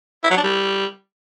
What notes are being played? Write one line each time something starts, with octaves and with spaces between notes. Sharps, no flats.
E4
F#3
D4
G3